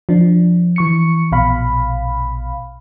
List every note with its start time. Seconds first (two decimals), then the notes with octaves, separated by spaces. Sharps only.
0.09 F3 D4
0.76 E3 C#6 C#7
1.32 A#1 B2 F5 B5